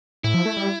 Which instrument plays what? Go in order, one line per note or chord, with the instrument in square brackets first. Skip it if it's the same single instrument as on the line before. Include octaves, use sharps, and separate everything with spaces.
[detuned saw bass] A2 [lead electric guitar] E4
[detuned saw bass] F3
A3
G3